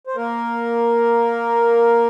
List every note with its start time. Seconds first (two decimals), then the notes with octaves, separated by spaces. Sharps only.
0.07 C5
0.16 A#3 A#4